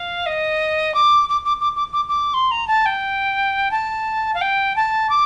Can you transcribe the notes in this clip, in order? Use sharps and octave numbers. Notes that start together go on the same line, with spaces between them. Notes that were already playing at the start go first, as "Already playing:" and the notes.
Already playing: F5
D#5
D6
D6
D6
D6
D6
D6
D6
C6
A#5
A5
G5
A5
F5
G5
A5
D6